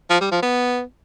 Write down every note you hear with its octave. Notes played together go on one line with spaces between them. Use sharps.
F3
G3
F3
B3